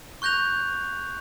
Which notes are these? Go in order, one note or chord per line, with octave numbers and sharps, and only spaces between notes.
C#6 F#6 G6 A#6 F7